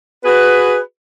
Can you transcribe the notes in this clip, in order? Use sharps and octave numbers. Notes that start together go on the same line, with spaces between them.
F#4 G#4 B4